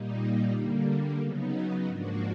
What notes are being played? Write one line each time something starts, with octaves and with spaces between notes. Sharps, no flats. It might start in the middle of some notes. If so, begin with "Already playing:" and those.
Already playing: A#2 G3 A#3 D#4
D3 G3 A#3
C#3 F#3 B3 D#4
G#2 F3 A#3 D4 F#4